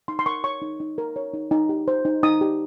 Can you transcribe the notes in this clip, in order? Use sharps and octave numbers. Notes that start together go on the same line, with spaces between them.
D#4 C6
C6
A#4 C#6
C#5 C#6
D#4
D#4
A#4
C#5
D#4
D#4
G4
C5
D#4
D#4 D#6
G4